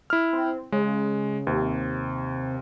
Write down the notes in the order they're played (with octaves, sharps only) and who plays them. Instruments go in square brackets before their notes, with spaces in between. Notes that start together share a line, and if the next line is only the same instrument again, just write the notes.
[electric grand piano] E4 F6
[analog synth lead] C4
[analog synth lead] C#3 [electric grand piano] G#3
[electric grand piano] D#2 [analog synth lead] C3